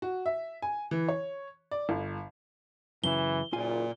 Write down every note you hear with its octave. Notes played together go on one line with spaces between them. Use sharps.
F#4
E5
G#5
E3
C#5
D5
G1
F#2 C#3 E3 E4 G7
F#1 A#2 F4 G#5